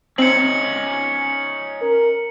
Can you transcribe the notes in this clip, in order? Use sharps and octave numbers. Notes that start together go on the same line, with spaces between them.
C4 C#4 D#4 C#7 F#7
A#4